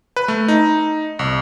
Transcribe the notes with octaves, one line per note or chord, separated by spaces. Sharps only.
B4
A3
D#4
C2